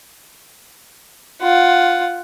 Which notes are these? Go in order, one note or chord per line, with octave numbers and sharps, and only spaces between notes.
F4 F#5